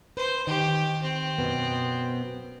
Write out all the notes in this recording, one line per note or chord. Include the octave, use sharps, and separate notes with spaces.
B4 C5
D#3 G4
C4
F#2 B2 B3